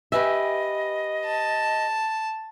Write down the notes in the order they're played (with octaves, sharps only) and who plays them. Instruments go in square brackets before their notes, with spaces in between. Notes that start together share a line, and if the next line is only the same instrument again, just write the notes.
[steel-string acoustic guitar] G4 B4 G#5 [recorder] D#5 [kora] E5
[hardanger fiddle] A5